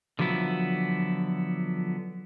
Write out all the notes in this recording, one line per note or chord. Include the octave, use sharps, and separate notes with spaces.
D3 F3 F#3 B3 E4